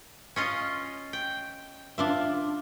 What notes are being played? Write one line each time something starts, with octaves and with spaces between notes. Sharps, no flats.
C#4 F4 D#5
G5
D4 F4 E5